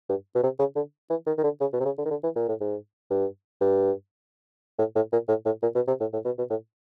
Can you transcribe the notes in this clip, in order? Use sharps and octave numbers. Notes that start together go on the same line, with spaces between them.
G2
B2
C3
C#3
D3
E3
D#3
D#3
D3
C#3
B2
C3
C#3
D3
D#3
D3
E3
A#2
A2
G#2
G2
G2
A2
A2
A#2
A2
A2
A#2
B2
C3
A2
A2
B2
B2
A2